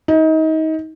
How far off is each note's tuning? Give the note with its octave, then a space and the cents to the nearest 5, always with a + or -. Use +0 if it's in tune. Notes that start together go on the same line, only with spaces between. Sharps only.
D#4 +30